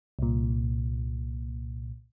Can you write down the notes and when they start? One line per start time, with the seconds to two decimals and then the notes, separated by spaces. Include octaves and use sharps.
0.19 C2 A#2